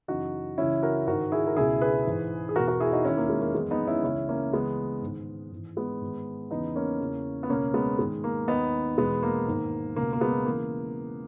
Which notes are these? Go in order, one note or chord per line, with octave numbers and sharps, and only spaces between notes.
F#2 C#3 E3 D#4 F#4
C#2 C#3 E3 C#4 E4
F#4 A#4
G#2 D#3 F#4 A#4
E4 G#4
A#4
C#2 B2 E4 G#4
G#4 B4
G#2 E3
G#4
E2 B2 F#4 A#4
F#4 A#4
E4 G#4
D#4 F#4
D#2 D#3 C#4 E4
A#3
G#3
A#3
F#2 E3 G#3 B3
B3 D#4
C#4 E4
C#2 C#3 E3 C#4 E4
A#3 C#4
C#2 C#3 E3 G#3 B3
G#2 D#3
G#2 E3
G#3 B3
G#2 D#3
E2 C#3 E3 B3 D#4
A#3 C#4
E2 C#3 E3
B3
C#2 B2 A#3 C#4
G#3 B3
G#2 D#3 G#3
A#3
D#2 D#3 B3 D#4
E2 B2 G#3 B3
A#3
G#2 D#3
C#2 B2 A#3
A#3
G#3 B3
C#3 E3 A#3